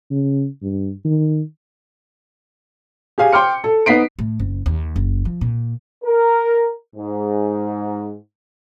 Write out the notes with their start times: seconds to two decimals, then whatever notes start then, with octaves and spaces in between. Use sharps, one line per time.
0.11 C#3
0.62 G2
1.05 D#3
3.18 G4 G#4 F5 G#5
3.33 G5 C6 D6 F6 C#7
3.64 A4
3.86 B3 D#4 B6 C7 D7
4.19 A2
4.39 F#1
4.66 D#2
4.96 F#1
5.25 F3
5.41 A#2
6.04 A#4
6.96 G#2